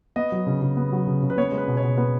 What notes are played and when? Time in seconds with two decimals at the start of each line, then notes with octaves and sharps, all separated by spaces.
0.16 B3 D#5
0.32 F#3
0.47 C#3
0.62 C#3
0.77 B3
0.92 F#3
1.07 C#3
1.23 C#3
1.30 B4
1.38 B3 C#5
1.52 G#3
1.58 B4
1.68 B2
1.77 C#5
1.83 B2
1.97 B3 B4